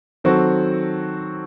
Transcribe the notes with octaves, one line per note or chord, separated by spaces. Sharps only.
D#3 F#3 C4 F#4 A4